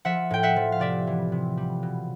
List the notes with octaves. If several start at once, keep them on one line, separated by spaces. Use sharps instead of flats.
F3 E5 F#5
A2 G5
E5 F#5
F3
F5
C3 D5 E5
E3
C3
G3
B2